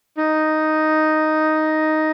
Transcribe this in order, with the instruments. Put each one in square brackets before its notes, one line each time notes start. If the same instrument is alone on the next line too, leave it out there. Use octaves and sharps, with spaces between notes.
[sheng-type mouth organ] D#4